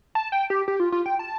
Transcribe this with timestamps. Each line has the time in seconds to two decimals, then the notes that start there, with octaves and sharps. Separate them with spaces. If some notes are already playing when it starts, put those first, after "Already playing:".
0.15 A5
0.32 G5
0.50 G4
0.68 G4
0.80 F4
0.92 F4
1.06 G5
1.19 A5